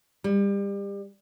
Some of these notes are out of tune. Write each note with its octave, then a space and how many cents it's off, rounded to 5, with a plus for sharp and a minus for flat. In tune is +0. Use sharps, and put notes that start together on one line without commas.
G3 +30